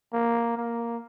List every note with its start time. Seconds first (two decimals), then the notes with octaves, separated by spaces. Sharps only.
0.13 A#3
0.57 A#3